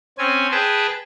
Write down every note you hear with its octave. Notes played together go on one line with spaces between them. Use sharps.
C4 C#4 G#5
G#4 B4 G5 A5